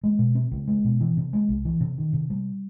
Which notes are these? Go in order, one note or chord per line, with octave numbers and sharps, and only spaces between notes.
G#3
B2
C4
C#2
G#3
B2
E3
C3
G#3
C2
E3
C3
D#3
C3
G3